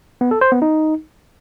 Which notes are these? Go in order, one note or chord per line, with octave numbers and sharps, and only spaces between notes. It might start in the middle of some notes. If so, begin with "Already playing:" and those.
B3
A4
C5
B3
D#4